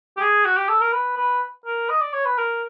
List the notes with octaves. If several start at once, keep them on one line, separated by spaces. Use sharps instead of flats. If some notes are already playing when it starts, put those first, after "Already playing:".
G4
G#4
F#4
G4
A4
A#4
B4
B4
A#4
D#5
D5
C#5
B4
A#4